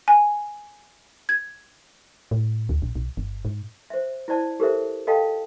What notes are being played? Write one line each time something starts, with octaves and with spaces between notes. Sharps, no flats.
G#5
G#6
A2
D2
A#1
B1
G1
G#2
C5 E5
E4 C5 D5 A5
G4 A4 A#4 C5 E5
A4 D#5 F5 G5 A5